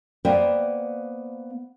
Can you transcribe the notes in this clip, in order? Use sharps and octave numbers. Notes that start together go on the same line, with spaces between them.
A#3 B3 C5 D5 F5 G5